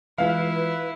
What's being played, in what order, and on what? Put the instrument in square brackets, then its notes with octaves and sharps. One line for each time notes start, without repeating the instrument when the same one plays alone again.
[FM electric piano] E3 G#3 F4 [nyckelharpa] E4 [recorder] B4 [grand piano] F5
[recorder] B4